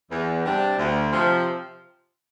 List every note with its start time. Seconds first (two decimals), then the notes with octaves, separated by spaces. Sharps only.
0.11 E2
0.44 C3 G3 D4
0.77 D2
1.11 C3 F3